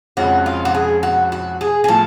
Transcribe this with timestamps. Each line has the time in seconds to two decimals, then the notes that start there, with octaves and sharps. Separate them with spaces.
0.17 F2 C#3 F3 G#3 C#4 F#4
0.46 F4
0.65 F#4
0.75 G#4
1.03 F#4
1.32 F#4
1.61 G#4
1.84 G#4
1.88 A2 F3 A3 F4 A4